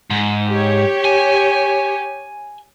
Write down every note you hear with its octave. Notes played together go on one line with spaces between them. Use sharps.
G#2
G4 C#5
G#5